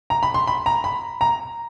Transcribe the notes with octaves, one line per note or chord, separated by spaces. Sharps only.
A#5
B5
C6
B5
A#5
B5
A#5